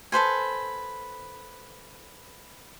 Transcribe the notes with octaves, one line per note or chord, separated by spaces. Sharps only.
A4 B4 C5 G#5